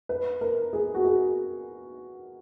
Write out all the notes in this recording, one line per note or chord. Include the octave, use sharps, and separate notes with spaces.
B4
A#4
G#4
F#4
G#4